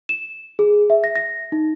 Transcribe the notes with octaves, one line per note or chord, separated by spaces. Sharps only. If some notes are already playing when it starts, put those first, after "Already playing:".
E7
G#4
E5
A#6
A#6
D#4